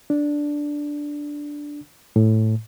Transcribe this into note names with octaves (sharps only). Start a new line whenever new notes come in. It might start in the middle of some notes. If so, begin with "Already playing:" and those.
D4
A2